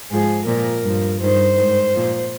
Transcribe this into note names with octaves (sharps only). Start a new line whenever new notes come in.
G#2 F3 G#4
A#2 F3 A#4
G2 F3
G2 D#3 C5
G#2 D#3
A#2 F3